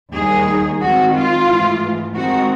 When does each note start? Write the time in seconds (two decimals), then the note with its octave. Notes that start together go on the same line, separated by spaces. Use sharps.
0.13 D#2 D#3 G3 A#3 D#4 G#4
0.81 D#3 G#3 C4 F#4
1.14 F4
1.47 G#2 E3 A3
2.14 D#3 G#3 C4 D#4 F#4